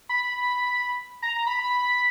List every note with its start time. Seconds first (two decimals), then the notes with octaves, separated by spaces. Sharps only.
0.09 B5
1.22 A#5
1.35 A#5
1.47 B5
1.59 B5